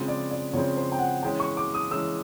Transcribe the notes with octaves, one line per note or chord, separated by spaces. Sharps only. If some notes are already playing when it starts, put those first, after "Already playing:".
Already playing: C#3 F3 G#3 C4
D5
D5
C#3 F3 G#3 C4 C#5
C5
G5
F#5
E3 G#3 C#4 G5
C#6
D6
D#6
E3 G#3 C#4 E6